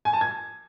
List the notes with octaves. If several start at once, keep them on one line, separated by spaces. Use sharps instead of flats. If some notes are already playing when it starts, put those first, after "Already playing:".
G#5
A5
G#6